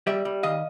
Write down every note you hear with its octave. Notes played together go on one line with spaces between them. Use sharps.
G3 D5 E5
G3
D#3 D#5 F5